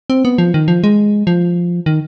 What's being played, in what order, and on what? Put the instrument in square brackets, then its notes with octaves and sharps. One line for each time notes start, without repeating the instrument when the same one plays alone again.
[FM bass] C4
B3
F3
D#3
F3
G#3
F3
D#3